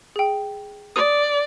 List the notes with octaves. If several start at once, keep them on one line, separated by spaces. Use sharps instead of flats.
G#4 G5
D5 D#6 D#7